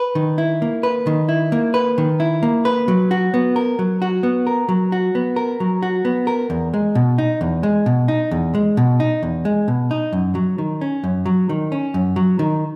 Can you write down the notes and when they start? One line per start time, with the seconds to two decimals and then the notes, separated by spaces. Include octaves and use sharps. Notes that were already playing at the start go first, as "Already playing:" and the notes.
Already playing: B4
0.15 D#3
0.38 E4
0.62 A#3
0.83 B4
1.07 D#3
1.29 E4
1.52 A#3
1.74 B4
1.98 D#3
2.20 E4
2.43 A#3
2.65 B4
2.88 F#3
3.11 F#4
3.34 B3
3.56 A#4
3.79 F#3
4.02 F#4
4.23 B3
4.47 A#4
4.69 F#3
4.92 F#4
5.15 B3
5.36 A#4
5.60 F#3
5.82 F#4
6.05 B3
6.27 A#4
6.50 E2
6.74 G#3
6.95 B2
7.18 D#4
7.41 E2
7.63 G#3
7.86 B2
8.08 D#4
8.31 E2
8.55 G#3
8.77 B2
9.00 D#4
9.23 E2
9.45 G#3
9.68 B2
9.91 D#4
10.13 F#2
10.35 F#3
10.58 D#3
10.81 C#4
11.04 F#2
11.26 F#3
11.49 D#3
11.72 C#4
11.94 F#2
12.16 F#3
12.39 D#3